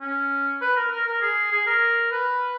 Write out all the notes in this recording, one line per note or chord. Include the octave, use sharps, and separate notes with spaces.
C#4
B4
A#4
A#4
A#4
G#4
G#4
A#4
B4